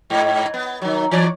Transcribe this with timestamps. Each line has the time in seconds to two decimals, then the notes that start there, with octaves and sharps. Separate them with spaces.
0.10 G#2
0.54 B3
0.82 D#3 F#3
1.11 E3 C#5 D5